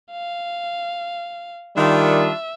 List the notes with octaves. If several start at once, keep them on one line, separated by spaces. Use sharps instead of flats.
F5
D#3 G3 D4 F4 E5